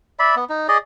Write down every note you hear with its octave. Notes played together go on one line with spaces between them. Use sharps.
D5 E5 B5
B3
D#4
G#4 D5 D#5